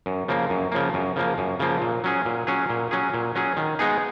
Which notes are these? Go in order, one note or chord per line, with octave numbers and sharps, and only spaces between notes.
F#2
C#3 F3 A#3
F#2
C#3 F3 A#3
F#2
C#3 F3 A#3
F#2
C#3 F3 A#3
A#2
F#3 C#4 G#4
A#2
F#3 C#4 G#4
A#2
F#3 C#4 G#4
A#2
F#3 C#4 G#4
D#3
G#3 B3 D#4 G#4